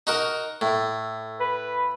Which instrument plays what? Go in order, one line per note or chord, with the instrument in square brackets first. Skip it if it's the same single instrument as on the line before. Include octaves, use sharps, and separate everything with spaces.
[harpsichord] D#4 F#4 A#4
A2
[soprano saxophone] B4